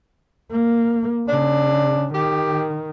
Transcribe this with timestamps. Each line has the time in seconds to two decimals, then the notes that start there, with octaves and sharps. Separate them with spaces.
0.52 A#3
1.28 C#3 D4
2.14 D#3 G4